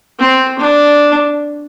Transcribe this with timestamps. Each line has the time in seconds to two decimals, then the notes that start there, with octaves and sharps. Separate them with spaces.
0.19 C4
0.58 D4